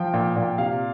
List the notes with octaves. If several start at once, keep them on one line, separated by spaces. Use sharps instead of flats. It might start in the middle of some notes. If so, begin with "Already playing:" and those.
Already playing: F3 G5
A#2
A#2
C3 F5